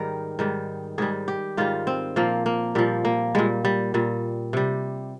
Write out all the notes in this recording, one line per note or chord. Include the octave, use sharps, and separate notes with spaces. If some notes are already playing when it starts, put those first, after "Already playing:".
Already playing: G#2 D#3 G3 A#4
G#2 D#3 G3
G#2 D#3 G3 G#4
G4
G#2 D#3 G3 F4
C4
A#2 F3 A#3
A#3
A#2 F3 G3
A#3
A#2 G3 G#3
G3
A#2 G3
C3 G3